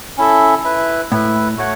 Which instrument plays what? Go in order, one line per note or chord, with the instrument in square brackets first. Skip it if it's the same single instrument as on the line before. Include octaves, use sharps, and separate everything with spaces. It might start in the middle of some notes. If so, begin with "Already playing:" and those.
[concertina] C#4 E4 A4 E5
E4 B4 E5
[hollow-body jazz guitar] A2 [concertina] E4 B4 E5
[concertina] A3 F#4 C#5 F#5